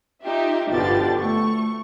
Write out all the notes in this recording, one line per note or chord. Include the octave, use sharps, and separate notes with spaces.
D#4 F4 G4 E5
G1 B2 D3 F3 G4 A6
A3 C#6